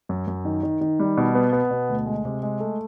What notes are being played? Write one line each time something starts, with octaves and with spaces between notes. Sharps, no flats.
F#2
F#2
D#3
D#3
D#3
G3
B2
B3
B3
B2
D2
G#3
C3
G#3
A3